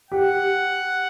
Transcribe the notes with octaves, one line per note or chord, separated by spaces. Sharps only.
G4 F#5